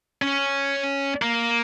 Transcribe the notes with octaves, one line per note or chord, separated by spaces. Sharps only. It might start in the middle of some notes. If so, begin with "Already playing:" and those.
C#4
A#3